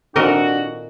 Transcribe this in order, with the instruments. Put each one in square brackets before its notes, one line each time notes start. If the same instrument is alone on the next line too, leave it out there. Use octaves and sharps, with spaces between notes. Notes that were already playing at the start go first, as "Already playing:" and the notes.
[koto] A#2 A#4 D#5 [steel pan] D#3 C4 A4 [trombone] D4 [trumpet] F#4